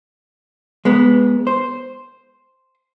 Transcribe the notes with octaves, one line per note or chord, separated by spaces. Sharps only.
G#3 B3
C5